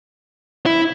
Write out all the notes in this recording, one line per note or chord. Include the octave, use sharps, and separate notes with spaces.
E4